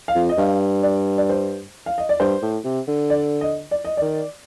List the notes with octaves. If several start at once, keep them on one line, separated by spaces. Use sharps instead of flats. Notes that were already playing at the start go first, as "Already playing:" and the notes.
F5
F2
D#5
G2 F5
D5
D5
C5
F5
D#5
D5
G2 C5
A2
C3
D3
D5
D#5
D5
D#5
D#3 D5